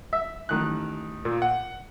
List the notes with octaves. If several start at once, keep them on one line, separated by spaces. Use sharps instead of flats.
E5
A1 D#3 F#6
A#2 A#3
F#5